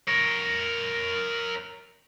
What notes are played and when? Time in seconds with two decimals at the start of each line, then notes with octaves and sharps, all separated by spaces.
0.08 A#4 C#5